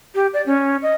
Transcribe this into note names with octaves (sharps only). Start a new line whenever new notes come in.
G4
D5
C#4
D#5